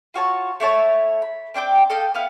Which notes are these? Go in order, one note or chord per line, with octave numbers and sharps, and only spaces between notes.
F4 F#4 C#5 A5
A3 E4 C#5 A5
B5
C4 D4 G5 D6
A4 D#5 F5 G5
B3 E4 F5 F#5